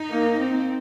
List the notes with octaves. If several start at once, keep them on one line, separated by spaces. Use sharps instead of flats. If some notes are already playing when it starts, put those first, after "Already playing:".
Already playing: D#4
A#3
C4